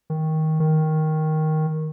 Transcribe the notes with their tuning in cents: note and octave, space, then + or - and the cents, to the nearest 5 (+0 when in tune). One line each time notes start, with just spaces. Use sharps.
D#3 +15
D#3 +5